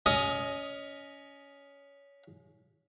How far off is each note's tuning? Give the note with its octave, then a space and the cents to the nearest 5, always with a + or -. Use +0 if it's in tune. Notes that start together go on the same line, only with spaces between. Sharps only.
C#4 +20 D#5 +0 D#6 +10